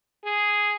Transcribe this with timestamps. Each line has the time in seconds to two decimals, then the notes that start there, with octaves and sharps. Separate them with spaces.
0.24 G#4